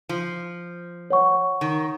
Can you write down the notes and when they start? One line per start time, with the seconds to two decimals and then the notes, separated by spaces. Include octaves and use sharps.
0.09 F3
1.10 C#5 F#5 C#6
1.61 D#3